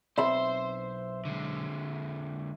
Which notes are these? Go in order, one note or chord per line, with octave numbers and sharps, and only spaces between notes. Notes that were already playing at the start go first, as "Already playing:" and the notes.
B1 C4 C5 E5 B5 C6 E6
D3 G#3